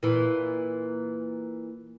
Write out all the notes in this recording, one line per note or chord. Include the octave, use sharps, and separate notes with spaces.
A#2 E3